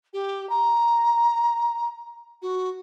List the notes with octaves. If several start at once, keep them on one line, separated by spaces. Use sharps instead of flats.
G4
A#5
F#4